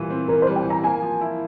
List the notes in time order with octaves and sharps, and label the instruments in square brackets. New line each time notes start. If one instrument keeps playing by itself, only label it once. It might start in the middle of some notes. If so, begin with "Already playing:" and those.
Already playing: [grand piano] A#2 E3 G3
C4
[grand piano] E3 [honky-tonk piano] A#4
[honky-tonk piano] C5
[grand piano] G3
[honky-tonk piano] G5
[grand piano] E3 [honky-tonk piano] A#5
[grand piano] A#3 [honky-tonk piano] G#5
[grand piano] F3
E4